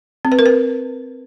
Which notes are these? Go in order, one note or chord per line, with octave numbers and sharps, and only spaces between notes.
C4
B4
A#4
B4